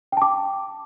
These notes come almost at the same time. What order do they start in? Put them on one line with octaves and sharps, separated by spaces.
G5 A5 D6